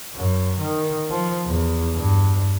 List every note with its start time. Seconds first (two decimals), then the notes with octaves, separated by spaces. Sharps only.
0.15 F#2
0.59 D#3
1.10 F3
1.46 E2
1.94 G2